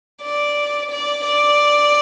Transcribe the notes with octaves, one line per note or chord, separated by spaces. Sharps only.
D5
D5
D5